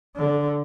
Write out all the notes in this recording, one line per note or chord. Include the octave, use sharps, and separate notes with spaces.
D3